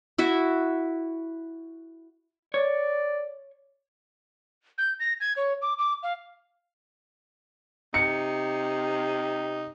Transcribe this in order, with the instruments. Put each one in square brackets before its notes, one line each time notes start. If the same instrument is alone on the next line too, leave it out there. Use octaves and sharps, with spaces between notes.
[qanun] E4 F#4 E5
[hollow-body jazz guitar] C#5 [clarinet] D5
[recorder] G6
A#6
G#6
C#5
D6
D6
F5
[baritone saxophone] C3 [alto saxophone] D#4 [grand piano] C#7